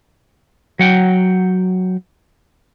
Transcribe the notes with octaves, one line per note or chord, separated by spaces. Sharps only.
F#3 F#5 G5